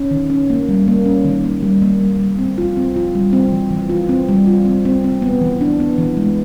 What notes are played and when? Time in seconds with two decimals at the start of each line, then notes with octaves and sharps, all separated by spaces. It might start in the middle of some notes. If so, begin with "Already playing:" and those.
Already playing: C#4
0.11 D#3
0.30 C#4
0.50 A#3
0.69 G3
0.88 A#3
1.06 C#4
1.25 D#3
1.44 A#3
1.62 G3
1.82 A#3
2.01 G3
2.20 G3
2.38 C4
2.58 F4
2.77 C4
2.96 F4
3.15 G3
3.33 C4
3.52 E3
3.71 E3
3.89 F4
4.09 C4
4.29 G3
4.47 F4
4.65 C4
4.85 C4
5.04 C4
5.22 B3
5.41 E3
5.61 D4
5.80 B3
5.98 E3
6.17 G#3